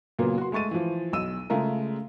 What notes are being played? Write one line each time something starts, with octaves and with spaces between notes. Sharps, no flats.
A#2 C#3 F#3 A#3 B3
F#4 C6
G#3 A3 C#6 A6 D#7
E3 F3
B1 E6 D#7
C#3 G#3 A3 F4 A#4